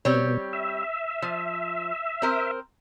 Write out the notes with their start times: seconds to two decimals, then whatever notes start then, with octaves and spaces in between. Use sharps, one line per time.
0.05 B2 G3 C4 C#5
0.53 E5
1.22 F3
2.22 C4 A#4 C5